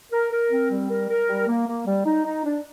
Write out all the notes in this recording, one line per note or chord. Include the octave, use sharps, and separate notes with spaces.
A#4
A#4
C4
G3
A#4
A#4
G3
A#3
A#3
G3
D#4
D#4
D4